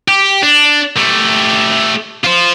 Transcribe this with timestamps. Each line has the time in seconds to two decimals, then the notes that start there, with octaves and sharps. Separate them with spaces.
0.08 G4
0.42 D4
0.96 A3 G4
2.24 F4 C5